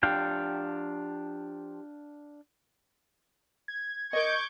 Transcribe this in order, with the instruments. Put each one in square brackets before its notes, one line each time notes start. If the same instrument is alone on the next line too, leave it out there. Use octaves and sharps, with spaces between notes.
[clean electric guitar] F3 G4 [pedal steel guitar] D4 F5 G5
[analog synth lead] G#6
[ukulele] A#4 D#5 [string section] C#6 D6 G6